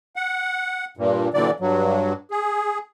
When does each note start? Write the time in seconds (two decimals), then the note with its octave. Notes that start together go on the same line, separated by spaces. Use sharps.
0.16 F#5
0.97 G2 A#2
1.34 A#2 D3 E3 F#3 D5
1.60 G2 F#3
2.31 G#4